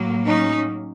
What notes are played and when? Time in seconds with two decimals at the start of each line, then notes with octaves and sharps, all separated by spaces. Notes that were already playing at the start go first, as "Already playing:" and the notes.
Already playing: A2 F#3 A#3
0.26 C#4 D#4